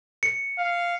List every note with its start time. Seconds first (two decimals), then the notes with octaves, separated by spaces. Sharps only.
0.23 C#7
0.59 F5